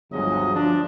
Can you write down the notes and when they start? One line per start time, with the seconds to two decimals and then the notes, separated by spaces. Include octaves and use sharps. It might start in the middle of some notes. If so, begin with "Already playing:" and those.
0.11 G1 D2 F3 F#3 G#3 D#5
0.54 F3 D4